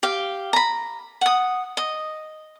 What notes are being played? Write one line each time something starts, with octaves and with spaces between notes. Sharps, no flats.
G4 F5
A#5 B5
F#5 D#6
D#5